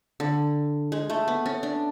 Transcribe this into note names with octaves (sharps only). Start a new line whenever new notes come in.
D3
G#3
A3
B3
C#4
D4